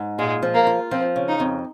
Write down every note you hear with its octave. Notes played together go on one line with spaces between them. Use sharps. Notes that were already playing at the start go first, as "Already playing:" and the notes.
Already playing: G#2
A#2 G#3
F3
A#3
F4
F3 C4
C#3
D#4
F2